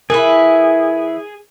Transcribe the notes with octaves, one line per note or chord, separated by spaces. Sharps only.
E3 E4 G#4 A#4